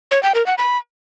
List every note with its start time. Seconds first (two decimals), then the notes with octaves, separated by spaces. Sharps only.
0.11 C#5
0.23 G5
0.35 A#4
0.46 F#5
0.58 B5